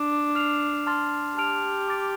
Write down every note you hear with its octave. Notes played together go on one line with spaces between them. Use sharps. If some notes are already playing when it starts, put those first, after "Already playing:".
Already playing: D4
F6 C7 F7
A5 C6 F6 A6
G4 A5 F6 D7 F7
D6 A6 D7